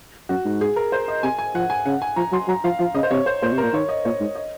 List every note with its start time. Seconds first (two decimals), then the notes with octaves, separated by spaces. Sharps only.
0.29 F#2 F#4
0.45 G#2
0.61 G#4
0.76 A#4
0.92 C5
1.08 D#5
1.23 C3 G#5
1.39 G#5
1.54 F3 F#5
1.70 G#5
1.86 C#3 F#5
2.02 G#5
2.16 F3 A#5
2.32 F#3 C6
2.48 F#3 A#5
2.64 F3 F5
2.79 F3 F5
2.95 C#3 D#5
3.03 C5
3.11 C3 C#5
3.26 C5
3.42 A#2 C5
3.52 C3
3.58 A#4
3.63 A#2
3.73 D#3 C#5
3.89 D#5
4.05 A#2 C#5
4.20 G#2
4.35 D#5